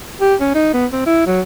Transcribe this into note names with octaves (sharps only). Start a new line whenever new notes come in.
G4
C#4
D#4
B3
C4
E4
F#3